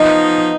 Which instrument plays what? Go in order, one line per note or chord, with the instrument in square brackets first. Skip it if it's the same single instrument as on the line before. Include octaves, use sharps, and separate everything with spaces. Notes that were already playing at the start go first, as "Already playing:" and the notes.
Already playing: [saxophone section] F3 B3 D#4 [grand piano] D#5